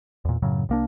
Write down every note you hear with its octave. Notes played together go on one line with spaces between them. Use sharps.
E2 A#2
F#2 A2 C#3 F#3
C2 A#3 D4